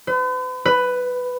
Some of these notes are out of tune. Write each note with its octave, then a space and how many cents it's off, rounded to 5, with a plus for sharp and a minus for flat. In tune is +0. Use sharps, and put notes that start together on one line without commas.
B4 +45
B4 +10